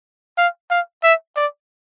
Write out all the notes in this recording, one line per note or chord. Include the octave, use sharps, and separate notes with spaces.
F5
F5
E5
D5